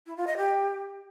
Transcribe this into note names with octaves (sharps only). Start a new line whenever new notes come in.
E4
F4
D#5
G4